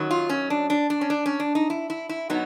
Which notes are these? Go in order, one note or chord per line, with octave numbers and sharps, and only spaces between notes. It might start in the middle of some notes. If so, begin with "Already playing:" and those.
Already playing: F#2 D#3 F#3
F4
C#4
D4
D4
D4
C#4
D4
C#4
D4
D#4
E4
E4
E4
B2 F#3 B3 D#4